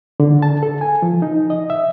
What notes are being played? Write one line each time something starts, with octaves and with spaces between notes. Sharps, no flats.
D3
A5
A4
G#5
F3
D#4
D#5
E5